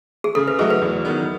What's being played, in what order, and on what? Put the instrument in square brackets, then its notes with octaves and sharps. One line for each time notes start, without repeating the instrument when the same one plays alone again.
[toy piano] G#4
[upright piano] C#3 [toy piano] A4
[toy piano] B4
[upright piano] F#3 A3 D#4 F#4 [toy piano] G#4
[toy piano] B4
[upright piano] E2
D#3 F#3 B3